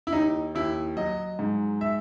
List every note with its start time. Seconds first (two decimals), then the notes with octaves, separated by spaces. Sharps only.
0.07 E4
0.12 D#2 D#4
0.55 D#2 E4
0.97 F#3 D#5
1.39 G#2
1.81 E5